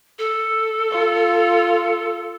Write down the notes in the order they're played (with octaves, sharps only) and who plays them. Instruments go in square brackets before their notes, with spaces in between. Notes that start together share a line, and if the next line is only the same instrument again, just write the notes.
[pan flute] A4
[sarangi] F4